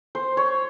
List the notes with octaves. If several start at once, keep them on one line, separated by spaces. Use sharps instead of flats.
C5
C#5